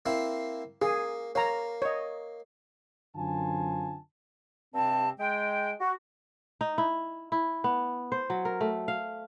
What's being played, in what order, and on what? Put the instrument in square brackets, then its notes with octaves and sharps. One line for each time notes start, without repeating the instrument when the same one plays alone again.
[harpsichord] A#3 C4 E4
[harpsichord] A#3 [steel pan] G#4
[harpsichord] A#3 [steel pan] C#5 A#5
[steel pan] C#5 D#5
[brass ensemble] F#2 D3 C4 F4 G#5 A5
[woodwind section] G2 C3 C4 A5
G#3 G5
F#4
[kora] D#4
E4
E4
B3
C5
F#3
A#4
A3
F5